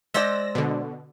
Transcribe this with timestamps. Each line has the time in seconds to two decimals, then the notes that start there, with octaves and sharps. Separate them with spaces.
0.14 G#3 C5 D5 E6 A#6
0.55 B2 D3